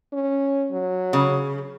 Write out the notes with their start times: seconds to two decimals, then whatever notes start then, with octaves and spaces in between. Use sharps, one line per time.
0.13 C#4
0.72 F#3
1.13 C#3